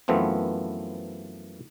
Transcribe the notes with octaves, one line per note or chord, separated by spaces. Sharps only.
F#2 E3 F3 A3 B3 C4